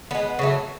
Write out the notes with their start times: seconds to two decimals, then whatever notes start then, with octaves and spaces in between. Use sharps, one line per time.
0.11 D3 B3
0.15 G#3
0.39 C#3 F#3 A3